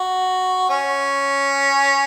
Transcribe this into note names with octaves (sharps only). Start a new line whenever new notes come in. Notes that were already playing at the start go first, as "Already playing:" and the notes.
Already playing: F#4
C#4